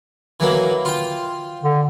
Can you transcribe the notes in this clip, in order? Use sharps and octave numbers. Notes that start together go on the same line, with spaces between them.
E3 F#3 A#3
F4 G5
D3